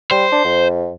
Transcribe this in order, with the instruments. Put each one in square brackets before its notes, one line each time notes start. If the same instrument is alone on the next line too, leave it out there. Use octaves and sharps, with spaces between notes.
[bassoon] G3 [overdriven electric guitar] C5
[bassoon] D4
F2